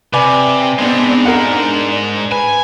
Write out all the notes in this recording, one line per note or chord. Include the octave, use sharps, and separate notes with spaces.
C3 B4 D5 G#5
G#2 G#3 B3 C4 D4
D4 A#4 F#5
B4 G#5